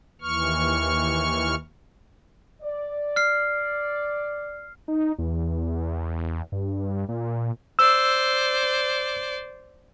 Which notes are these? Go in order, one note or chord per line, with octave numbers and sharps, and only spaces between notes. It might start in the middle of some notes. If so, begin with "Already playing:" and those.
D#2 E3 C#6 F6
D5
F6 C7
D#4
E2
G2
A#2
C5 D5 E6